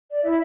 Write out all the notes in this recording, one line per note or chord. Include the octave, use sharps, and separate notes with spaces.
D5
E4 E5